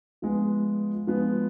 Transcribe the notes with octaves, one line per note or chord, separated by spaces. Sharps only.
F3 G#3 B3
F3 G#3 B3